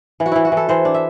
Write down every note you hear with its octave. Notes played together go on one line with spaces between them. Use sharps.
E3
F#4
E3 E4
F#4
E3
A4
E3 C5
D4
E5